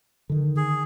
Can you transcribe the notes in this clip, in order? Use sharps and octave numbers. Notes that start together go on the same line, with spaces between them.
D3 D#3
G#4